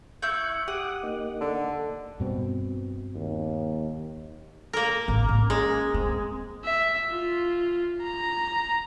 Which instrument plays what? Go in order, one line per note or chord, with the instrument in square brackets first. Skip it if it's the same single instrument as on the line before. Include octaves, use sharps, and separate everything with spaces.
[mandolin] E4 G6 [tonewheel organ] C#6 F#6
[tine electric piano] G4 [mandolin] F#5 [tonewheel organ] D6 D#6 F#6
[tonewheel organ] A#3 D#4
[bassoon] D3
[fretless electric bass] G2 B2 C4
[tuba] D#2
[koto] A#3 A#4
[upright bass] A1
C#4
[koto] G#3
[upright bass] C4
[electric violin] E5
F4
A#5